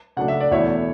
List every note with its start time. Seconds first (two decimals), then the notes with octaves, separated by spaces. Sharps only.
0.17 C#3 F#3 A3 D4 F#5
0.28 E5
0.41 D5
0.51 E2 B2 A3 E4 C#5 E5